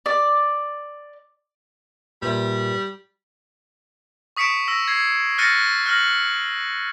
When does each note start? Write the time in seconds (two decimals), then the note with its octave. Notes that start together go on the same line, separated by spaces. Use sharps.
0.06 D5
2.22 A#2 G3 B4 E5
4.37 C#6 D#6 B6 C#7 D7 E7
4.68 E6 A#6
4.88 G#6 C7
5.38 F6 F#6 A6 A#6 C#7 D#7
5.86 F6 F#6 A#6 F#7